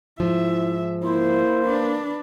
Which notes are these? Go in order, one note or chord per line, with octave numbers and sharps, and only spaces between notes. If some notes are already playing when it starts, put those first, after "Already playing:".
G#2 F3 E4 E5
A#3 E4 C5
D4 B4